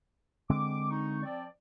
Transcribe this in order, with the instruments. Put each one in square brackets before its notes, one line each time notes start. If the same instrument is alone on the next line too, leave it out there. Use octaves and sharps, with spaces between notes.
[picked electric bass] D3 G#3 C4 [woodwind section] D6
[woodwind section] D#4 C#6
F3 C4 D5